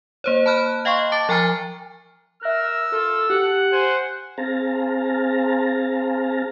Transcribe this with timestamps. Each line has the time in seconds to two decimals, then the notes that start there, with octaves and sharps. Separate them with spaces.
0.24 A#3 C5 C#5
0.46 A5 B5 F6 F#6
0.85 D#5 F5 G5 C6 C#6
1.12 A5 D6 A6
1.29 F3 G5 G#5 A#5 F6 A6
2.42 A#4 E5 E6 F#6
2.92 F4 A4
3.30 G4 F#5
3.72 C5 G#5
4.38 C4 G#4 F5 A5 A#5